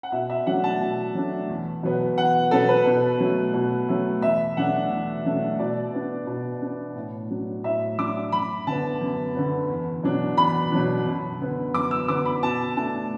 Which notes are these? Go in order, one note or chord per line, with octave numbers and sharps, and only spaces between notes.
F#5
B2 E5
E5
F#3 A3 D4 F#5
A5
B2
F#3 A3 D4
E2
B2 F#3 B3
E2 F#5
B2 F#3 B3 A4
B4
B2
F#3 A3
B2
F#3 A3
E2 E5
B2 F#3 A3 D4 F#5
E2
B2 F#3 A3 D4
B2 D5
B3 D4
B2
B3 D4
A2
F#3 D4
A2 E5
F#3 D4 D6
F#2 B5
D3 B3 A5
F#2
D3 B3
E2
B2 F#3 D4
E2 B5
B2 F#3 D4
F#2
D3 B3
F#2 D6
E6
D3 B3 D6
B5
B2 A5
A3 D4 A5